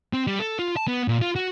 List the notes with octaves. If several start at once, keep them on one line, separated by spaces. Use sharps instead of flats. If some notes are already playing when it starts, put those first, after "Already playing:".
C4
G3
A4
F4
A5
B3
A#2
F4
F#4